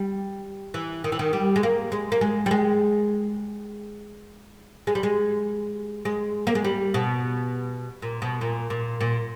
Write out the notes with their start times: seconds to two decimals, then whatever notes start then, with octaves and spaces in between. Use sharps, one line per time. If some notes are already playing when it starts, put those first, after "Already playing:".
Already playing: G3
0.74 E3
1.04 D#3
1.12 E3
1.19 D#3
1.33 G3
1.56 G#3
1.63 A#3
1.92 G#3
2.12 A#3
2.21 G#3
2.46 G3
2.51 G#3
4.87 G#3
4.95 G3
5.03 G#3
6.05 G#3
6.47 A#3
6.55 G#3
6.64 G3
6.94 B2
8.02 A#2
8.22 B2
8.41 A#2
8.70 A#2
9.01 A#2